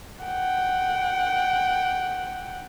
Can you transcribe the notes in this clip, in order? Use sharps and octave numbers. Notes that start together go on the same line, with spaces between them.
F#5 G5